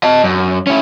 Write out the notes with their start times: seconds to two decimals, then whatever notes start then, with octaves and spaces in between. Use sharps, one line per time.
0.03 D#5 A5
0.24 F#2
0.67 C#4 E4